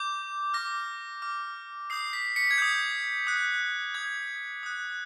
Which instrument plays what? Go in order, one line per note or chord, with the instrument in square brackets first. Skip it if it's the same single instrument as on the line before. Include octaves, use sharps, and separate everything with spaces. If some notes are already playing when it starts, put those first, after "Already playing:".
Already playing: [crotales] D6 G6
D6 F6 A#6
D6 F6
D#6 G6 C7
B6
B6 C#7
G#6
D#6 G6
D#6 F#6
D#6 F#6 G#6
D#6 F#6